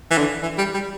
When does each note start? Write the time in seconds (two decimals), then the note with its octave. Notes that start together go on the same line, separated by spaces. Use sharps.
0.11 E3
0.18 D3
0.43 E3
0.58 G3
0.74 G3